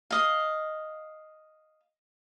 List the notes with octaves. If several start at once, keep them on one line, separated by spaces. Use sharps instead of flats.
D#5 F5